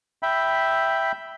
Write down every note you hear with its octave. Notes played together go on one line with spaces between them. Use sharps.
E5 G5 B5